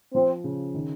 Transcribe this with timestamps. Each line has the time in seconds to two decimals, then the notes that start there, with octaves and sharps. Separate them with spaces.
0.14 F3 C4
0.44 C#3
0.74 D#3